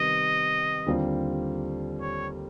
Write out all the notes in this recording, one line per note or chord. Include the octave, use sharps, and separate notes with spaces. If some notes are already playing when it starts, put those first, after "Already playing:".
Already playing: C3 D#3 G3 B3 D#5
D#2 D3 G3 C4 F4
C#5